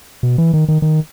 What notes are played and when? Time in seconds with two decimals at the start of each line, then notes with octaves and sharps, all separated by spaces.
0.23 B2
0.38 E3
0.54 D#3
0.68 D#3
0.82 D#3